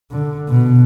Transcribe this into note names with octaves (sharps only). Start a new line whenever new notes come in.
D3
B2